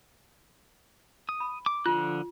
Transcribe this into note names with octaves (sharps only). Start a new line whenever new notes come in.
D#6
B5
D6
D3 F3 F4 F#6